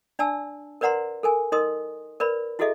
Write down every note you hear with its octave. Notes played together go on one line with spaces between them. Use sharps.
D4 D5 G#5 A5 E6
A#4 B4 D5 F#5 A#5 C6
A4 A#4 G#5
D#4 A#4 D#5 C6 D#6
A#4 B4 D5 B5
E4 F#4 G#4 A4 D#5 E5